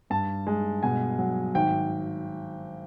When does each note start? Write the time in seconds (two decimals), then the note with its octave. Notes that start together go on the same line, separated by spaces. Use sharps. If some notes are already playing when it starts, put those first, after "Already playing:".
0.10 G2 A5
0.47 G#3
0.83 B2 G#5
1.19 F#3
1.55 G#1 G5